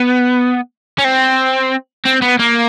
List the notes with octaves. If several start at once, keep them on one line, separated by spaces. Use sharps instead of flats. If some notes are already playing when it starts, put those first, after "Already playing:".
Already playing: B3
C#4
C4
C4
B3
A#3